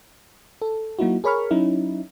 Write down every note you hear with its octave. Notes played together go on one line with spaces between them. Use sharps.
A4
F#3 A#3 D#4 E4 F#4
G#4 A#4 C#5 B5 C#6 F6
F#3 C#4 D#4 E4